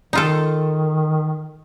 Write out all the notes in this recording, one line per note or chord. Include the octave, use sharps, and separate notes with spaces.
D#3 D#4 F4 A4